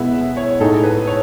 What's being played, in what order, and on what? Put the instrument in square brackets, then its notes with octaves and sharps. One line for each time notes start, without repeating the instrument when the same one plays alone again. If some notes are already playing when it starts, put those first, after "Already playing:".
Already playing: [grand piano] B2 G#3 B3 E4 [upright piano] E5 F#5
[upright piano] E5
C#5
[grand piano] A2 G#3 D#4 G#4 [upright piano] A4
[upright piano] B4
C#5